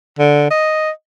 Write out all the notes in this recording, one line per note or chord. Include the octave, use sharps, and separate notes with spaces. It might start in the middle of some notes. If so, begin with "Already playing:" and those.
D3
D#5